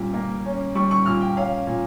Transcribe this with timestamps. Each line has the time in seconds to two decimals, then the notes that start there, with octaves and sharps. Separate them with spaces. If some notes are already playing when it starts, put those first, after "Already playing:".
Already playing: A#2 G3 C#4
0.14 A#3
0.45 C#4
0.75 G3 C#6
0.91 C#6
1.06 A#2 F6
1.21 G5
1.37 C#4 F5
1.67 A#2